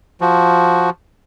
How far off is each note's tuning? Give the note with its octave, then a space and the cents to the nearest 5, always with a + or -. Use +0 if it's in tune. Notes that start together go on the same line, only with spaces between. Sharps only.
F3 +0 F#4 +0